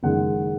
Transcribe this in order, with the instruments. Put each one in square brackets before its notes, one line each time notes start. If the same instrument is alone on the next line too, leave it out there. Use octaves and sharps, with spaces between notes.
[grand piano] F#1 D#3 G#3 F#5